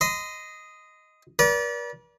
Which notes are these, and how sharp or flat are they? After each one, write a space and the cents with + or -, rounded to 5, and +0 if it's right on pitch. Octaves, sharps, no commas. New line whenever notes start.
D#5 +0 C6 -35
B4 -45 D5 -25